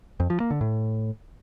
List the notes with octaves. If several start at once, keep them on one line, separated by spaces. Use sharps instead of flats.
F2
F3
A#3
D3
A2